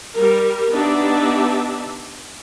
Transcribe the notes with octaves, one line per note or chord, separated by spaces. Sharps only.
G3 A#4
B3 D4 D#4 G4 D5 E5